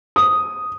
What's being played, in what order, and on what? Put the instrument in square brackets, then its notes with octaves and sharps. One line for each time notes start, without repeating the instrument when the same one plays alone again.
[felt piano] D#6